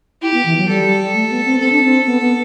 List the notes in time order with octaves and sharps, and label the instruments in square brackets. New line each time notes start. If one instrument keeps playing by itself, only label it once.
[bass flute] E4 [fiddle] G4
[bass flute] B3
E3
F#3
[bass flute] G3 [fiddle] A4
[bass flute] A3
B3
C4
[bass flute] C4 [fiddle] A4
[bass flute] D4
C4
B3
B3